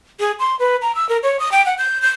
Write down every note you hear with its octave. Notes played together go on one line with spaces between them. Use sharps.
G#4
C6
B4
A#5
E6
A#4
C#5
D#6
G5
F#5
G6
G6